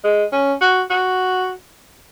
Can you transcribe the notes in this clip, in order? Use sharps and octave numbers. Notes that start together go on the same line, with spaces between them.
G#3
C#4
F#4
F#4